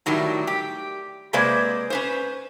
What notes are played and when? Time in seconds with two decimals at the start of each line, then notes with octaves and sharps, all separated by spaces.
0.06 A2 D#3 F#3 G3
0.47 G4
1.33 C3 G#3 A#3 B4 C5 D5
1.90 C#4 B4 C5